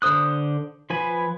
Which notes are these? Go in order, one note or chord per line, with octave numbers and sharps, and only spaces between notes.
D3 C5 D#6 F#6
F3 B4 G#5 B5